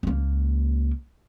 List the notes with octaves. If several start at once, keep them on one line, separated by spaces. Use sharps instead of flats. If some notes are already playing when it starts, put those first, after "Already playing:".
C#2 A#3